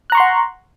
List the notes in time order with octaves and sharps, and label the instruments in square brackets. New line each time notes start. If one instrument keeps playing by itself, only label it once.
[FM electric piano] F#6
A#5
C#6
C6
F#5